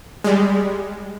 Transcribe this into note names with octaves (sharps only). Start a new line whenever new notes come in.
G3 G#3